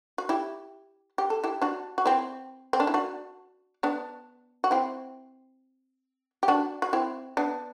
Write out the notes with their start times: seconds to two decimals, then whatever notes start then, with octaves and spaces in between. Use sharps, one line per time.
0.18 F#4
0.29 E4 G4
1.18 G4
1.30 A4
1.44 E4 G4
1.62 D4 F#4
1.98 F#4
2.06 C4 E4
2.73 C4
2.80 D4
2.87 E4
2.94 D4 F#4
3.83 B3 D4
4.64 F#4
4.71 C4 E4
6.43 G4
6.48 D4 F#4
6.82 F#4
6.93 C4 E4
7.37 B3 D4